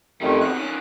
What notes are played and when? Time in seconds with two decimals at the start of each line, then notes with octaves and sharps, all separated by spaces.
0.21 F2 D#3 G3 A3 C#4
0.41 C3 B3 F#6
0.54 D#3 C#4